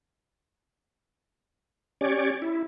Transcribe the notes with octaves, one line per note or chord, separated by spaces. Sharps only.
C#4 G4 C#5 D5
E4